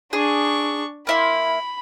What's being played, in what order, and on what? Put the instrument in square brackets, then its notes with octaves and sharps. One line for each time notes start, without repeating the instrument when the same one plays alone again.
[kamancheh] D4 C#6 [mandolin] G#4
[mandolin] A#3 E4 C6 [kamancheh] B5